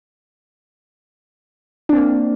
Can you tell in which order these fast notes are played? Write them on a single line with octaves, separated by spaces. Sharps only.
D4 C4 A#3